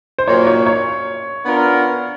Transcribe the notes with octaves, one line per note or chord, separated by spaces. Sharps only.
C5
A#2 F#3 A#3 C#5
C#5
C#5
B3 D4 F4 A#4